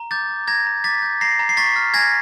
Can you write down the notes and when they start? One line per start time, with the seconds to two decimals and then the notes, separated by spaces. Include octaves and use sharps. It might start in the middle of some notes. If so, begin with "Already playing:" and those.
Already playing: A#5
0.11 D6 G6 A6
0.29 G6
0.47 A#5 G#6 A#6
0.67 A#5
0.84 D6 A6 B6
1.02 G6
1.21 A#5 A#6 C7
1.39 A#5
1.49 C7
1.57 C#6 A6 B6
1.76 F6
1.94 G#5 G#6 A#6